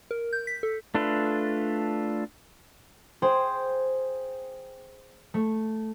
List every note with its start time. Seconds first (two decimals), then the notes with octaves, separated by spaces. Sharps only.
0.11 A#4
0.33 G6
0.47 B6
0.63 A4
0.95 A3 D4 F4 A4 B4
3.22 G#4 C5 G5
5.34 A3